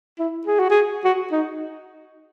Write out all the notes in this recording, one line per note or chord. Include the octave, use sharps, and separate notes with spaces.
E4
G#4
F#4
G#4
F#4
D#4